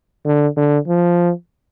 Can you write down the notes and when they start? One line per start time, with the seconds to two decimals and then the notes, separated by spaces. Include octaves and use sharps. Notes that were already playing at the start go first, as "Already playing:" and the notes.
0.26 D3
0.56 D3
0.88 F3